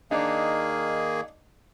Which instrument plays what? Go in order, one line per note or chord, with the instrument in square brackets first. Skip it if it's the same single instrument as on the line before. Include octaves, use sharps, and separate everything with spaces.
[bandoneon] D#3 A#3 G#4 [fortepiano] D4 D#4